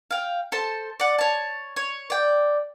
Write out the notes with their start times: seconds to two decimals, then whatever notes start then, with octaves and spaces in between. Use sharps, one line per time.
0.11 F5 G5
0.52 A4 C5 A5
1.00 D5 F#5
1.18 C#5 A5
1.76 C#5
2.10 D5 G5